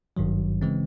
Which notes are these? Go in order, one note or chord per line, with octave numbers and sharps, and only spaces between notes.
G#1 G2 D#3 F#3
C#3 E3 G#3 C4